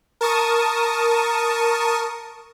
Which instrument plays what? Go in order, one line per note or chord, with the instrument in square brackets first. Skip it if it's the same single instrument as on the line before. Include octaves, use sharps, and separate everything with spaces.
[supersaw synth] A#4 A5 C#6 D#6